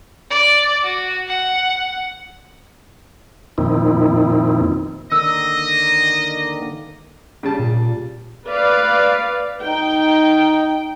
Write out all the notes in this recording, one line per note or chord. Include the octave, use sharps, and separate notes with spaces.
D5
F#4
F#5
F2 A#2 D#3 C4 D#4 E4
D3 D#3 A#3 D#5 E6
C#3 G3 A5
A#2
B4 D5 F5
D#4 G5